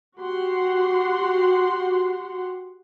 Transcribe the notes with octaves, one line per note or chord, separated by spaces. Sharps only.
F#4 G4 F#5 C6